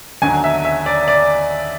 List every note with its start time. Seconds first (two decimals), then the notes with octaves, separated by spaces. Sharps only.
0.22 D#2 D3 F#3 G#5
0.44 E5
0.65 E5
0.86 D5
1.08 D5